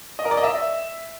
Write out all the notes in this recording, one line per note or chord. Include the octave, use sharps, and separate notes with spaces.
D#5
A#4
D5
D#5
E5